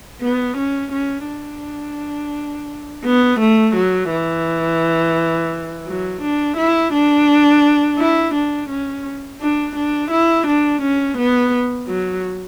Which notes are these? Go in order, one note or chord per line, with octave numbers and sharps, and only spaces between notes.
B3
C#4
C#4
D4
B3
A3
F#3
E3
F#3
D4
E4
D4
E4
D4
C#4
D4
D4
E4
D4
C#4
B3
F#3